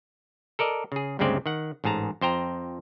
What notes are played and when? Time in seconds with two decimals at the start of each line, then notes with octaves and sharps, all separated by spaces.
0.59 A4 A#4 D5 D#5
0.92 C#3 G#4
1.19 D2 G2 C#3 G#3 C4 D5
1.46 D#3 F#5
1.84 A1 G#2 G#4 A5 A#5
2.21 F2 C5 G5 A#5